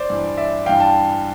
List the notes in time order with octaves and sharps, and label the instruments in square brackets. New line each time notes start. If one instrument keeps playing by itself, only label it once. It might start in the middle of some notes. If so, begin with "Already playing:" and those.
Already playing: [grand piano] C5 D5
G2 E3
D5 E5
G2 E3 F5 G5
G5 A5